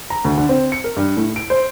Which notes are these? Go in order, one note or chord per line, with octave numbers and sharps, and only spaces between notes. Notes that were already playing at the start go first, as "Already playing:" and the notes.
A#5
D2
D3
C4
C#7
A#4
G2
A2
D7
C5